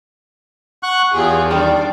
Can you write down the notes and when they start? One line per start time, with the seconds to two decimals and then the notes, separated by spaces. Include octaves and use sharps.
0.83 F#5 C#6 F#6
1.14 E2 F4 G4 G#4
1.51 D#3 G3 D4 F4 D5